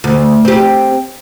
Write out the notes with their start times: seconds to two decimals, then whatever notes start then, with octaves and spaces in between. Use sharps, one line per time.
0.04 D2
0.45 C4 G4